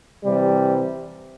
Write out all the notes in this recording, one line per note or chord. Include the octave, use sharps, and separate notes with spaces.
C3 E3 G3